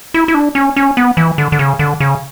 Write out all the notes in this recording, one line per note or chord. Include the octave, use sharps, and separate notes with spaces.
E4
E4
D4
C#4
C#4
B3
E3
D3
D3
C#3
D3
C#3